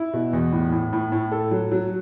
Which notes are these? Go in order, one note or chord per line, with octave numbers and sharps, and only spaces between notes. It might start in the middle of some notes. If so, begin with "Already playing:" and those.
Already playing: E4
B2
E2
A2
A2
A2
A2
A4
F#3
F#3